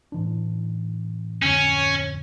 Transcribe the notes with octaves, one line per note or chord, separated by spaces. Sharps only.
A2 E3 D4
D1 F2 D3 C#4